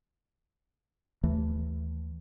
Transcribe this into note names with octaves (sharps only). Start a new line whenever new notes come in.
D#2 E3 A3